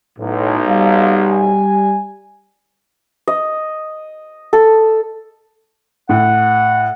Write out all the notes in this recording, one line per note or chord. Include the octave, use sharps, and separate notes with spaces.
B1 A2
G3 F5
G#5
D#5
A4
A2 F#5